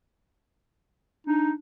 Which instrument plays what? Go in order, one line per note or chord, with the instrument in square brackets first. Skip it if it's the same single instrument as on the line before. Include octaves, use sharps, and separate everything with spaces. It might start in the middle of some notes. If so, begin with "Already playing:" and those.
[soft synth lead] D4 [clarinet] D#4